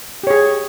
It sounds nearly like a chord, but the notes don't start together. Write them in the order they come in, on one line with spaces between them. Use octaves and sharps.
G4 C#5 G#4